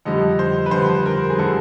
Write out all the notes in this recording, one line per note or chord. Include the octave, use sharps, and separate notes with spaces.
F2 D3 G3 D#5
C5
B4
F2 D3 G3 C5
A#4
G#4
D3 G3 A4